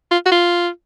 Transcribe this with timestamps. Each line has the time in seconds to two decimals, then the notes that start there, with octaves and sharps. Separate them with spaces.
0.12 F4
0.26 F#4
0.32 F4